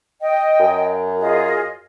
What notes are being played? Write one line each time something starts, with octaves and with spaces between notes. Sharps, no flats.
D#5 G5
F#2
F4 G#4 D#5